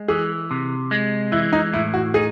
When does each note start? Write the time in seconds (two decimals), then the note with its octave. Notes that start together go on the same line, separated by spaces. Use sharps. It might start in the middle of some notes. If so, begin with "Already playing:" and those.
Already playing: G#3
0.08 E3 G#4
0.51 C3
0.91 G#3
1.32 E3 E4
1.53 D#4
1.73 A2 E4
1.94 F#4
2.14 D#4 G#4